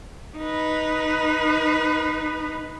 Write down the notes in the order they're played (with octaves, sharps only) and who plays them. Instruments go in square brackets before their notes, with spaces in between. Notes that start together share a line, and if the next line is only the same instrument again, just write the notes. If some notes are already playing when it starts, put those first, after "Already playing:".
[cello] D#4 B4